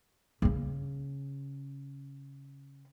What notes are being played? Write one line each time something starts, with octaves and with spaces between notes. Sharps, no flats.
C#3 C#4